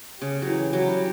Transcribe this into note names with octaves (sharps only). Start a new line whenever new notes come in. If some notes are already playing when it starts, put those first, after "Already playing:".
C#3 G4
F#3
E3
F#3
G3
F#3